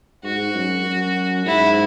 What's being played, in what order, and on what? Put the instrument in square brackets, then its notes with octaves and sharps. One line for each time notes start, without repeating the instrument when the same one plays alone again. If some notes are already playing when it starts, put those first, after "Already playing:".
[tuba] G#2 [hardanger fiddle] F#4
[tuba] F#2
F#2
[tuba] G#2 [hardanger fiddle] E4